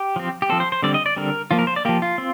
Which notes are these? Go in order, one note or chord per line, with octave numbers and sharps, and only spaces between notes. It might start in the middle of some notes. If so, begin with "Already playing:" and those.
Already playing: G4
F3 C4
G4
F3 C4 A4
C5
C5
D3 G3 C4 D5
D#5
D5
D3 G3 C4 A#4
F3 A#3 F4
A#4
C5
D5
F3 A#3 G4
F4
C4